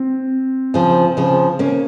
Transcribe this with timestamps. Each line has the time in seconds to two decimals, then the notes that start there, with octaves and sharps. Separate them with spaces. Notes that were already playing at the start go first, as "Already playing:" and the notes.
Already playing: C4
0.74 C#3 F3
1.17 C#3 F3
1.59 A#3 C#4